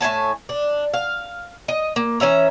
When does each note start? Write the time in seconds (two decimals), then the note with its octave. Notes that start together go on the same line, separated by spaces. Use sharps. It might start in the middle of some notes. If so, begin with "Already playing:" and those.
0.01 A2 E5 G#5 A5
0.49 D4
0.94 F5
1.68 D#5
1.96 A#3
2.20 E3 C#4 E5 A#5